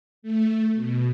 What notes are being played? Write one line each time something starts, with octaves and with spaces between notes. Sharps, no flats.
A3
B2